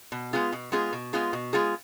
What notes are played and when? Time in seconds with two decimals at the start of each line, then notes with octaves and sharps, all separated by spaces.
0.12 B2
0.33 G#3 B3 F4 G#4
0.52 B2
0.72 G#3 B3 F4 G#4
0.93 B2
1.13 G#3 B3 F4 G#4
1.33 B2
1.53 G#3 B3 F4 G#4